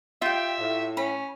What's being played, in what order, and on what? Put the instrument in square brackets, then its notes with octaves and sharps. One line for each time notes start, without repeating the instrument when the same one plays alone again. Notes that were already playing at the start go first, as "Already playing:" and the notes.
[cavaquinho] F4 G4 [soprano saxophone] E5 [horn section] G5
[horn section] A2
[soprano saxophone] C#4 [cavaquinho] B5